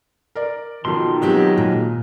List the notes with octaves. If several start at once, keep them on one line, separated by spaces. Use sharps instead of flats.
A#4 D5
B1 D#3 F3 C6
F#3 G#3 B3 C4 G4
A#2